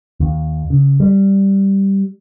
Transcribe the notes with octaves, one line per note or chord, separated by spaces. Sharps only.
D#2
C#3
G3